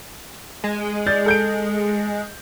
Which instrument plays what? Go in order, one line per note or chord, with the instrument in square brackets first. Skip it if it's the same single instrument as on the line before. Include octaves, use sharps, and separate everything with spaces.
[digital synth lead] G#3
[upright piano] D5 G6 A6
A4 G6 D7